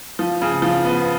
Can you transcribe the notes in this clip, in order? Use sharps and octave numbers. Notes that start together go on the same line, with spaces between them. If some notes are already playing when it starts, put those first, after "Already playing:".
F3
C#3
F3
B3